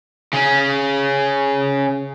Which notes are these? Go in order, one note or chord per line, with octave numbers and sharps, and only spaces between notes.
C#3 C#4